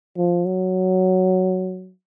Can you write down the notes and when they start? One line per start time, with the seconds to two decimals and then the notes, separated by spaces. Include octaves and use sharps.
0.17 F3
0.46 F#3